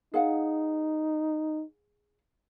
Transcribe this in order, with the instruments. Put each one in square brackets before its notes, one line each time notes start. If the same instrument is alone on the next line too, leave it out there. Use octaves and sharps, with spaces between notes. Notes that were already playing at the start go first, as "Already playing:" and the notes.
[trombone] D#4 [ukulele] G#4 F5 F#5